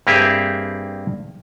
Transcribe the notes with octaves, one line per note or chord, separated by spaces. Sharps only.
G2 A#3 C4 G4 G#4 E5